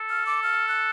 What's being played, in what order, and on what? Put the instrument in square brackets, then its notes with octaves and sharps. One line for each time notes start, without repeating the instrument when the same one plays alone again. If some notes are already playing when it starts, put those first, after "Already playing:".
Already playing: [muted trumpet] A4
[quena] F6
D6
F6
F#6